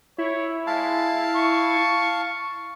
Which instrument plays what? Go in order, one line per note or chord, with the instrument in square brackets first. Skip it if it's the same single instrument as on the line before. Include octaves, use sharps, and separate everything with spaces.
[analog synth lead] E4 [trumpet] C#5
[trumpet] G#3 [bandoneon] F5 A5
[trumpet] C#6